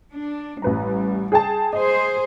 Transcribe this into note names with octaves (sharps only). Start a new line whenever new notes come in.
D4
A1 G3 B4 A#5
G#4 G5 A5
G#4 C5 D#5